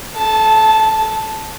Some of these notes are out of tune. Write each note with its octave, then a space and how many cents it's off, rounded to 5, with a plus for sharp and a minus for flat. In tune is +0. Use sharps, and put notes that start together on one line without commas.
A4 -35 A5 +0